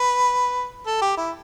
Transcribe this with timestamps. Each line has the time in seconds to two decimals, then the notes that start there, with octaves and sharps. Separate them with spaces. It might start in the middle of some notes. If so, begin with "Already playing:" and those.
Already playing: B4
0.86 A4
1.01 G4
1.17 E4